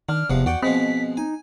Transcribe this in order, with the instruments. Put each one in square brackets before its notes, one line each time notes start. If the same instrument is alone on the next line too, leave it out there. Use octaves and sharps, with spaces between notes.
[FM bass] D#3 [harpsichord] D4 [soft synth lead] F6
[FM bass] E1 [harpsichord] E2 F3 F#5 [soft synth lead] C3
[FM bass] E2 [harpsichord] F#4 D5 G5 [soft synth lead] F#5
[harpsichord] B2 F3 G#3 [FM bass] C4 [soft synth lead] B6
[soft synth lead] D#4 [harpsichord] G#5